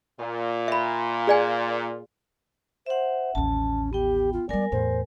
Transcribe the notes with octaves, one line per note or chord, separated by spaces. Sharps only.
A#2 F4
E5 B5
G#4 D5 G#5
C5 E5 F#5
A1 D#2 C#4 A5
B3 G4 G5
F4
G3 B3 A#4 D5 G#5
E2 A2 C5